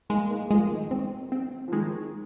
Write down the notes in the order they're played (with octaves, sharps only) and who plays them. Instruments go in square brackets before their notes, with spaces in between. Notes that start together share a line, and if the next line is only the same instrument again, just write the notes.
[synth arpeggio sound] G#3 [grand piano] A#3 D#4
[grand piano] A#3 D#4
[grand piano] F3 A#3 [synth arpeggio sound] G#3
[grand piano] D#3
[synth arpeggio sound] C4
C4
[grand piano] F3
[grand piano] D#3 [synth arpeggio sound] G#3